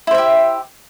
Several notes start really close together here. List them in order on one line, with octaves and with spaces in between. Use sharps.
E4 C5 E5 G4